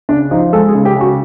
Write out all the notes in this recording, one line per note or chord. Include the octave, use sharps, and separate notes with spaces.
C#3 D4
F3 D#4
G#3 A4
G#4
C#3
G4
C#3 F#4